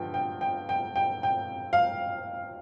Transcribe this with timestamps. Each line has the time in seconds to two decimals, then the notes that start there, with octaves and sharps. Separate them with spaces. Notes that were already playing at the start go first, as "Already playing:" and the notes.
Already playing: G2 D3 F3 G5
0.14 G5
0.41 G5
0.69 G5
0.96 G5
1.23 G5
1.73 F5